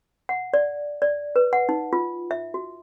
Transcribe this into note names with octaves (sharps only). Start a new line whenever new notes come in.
F#5
D5
D5
B4
F#5
D#4
F4
E5
F#4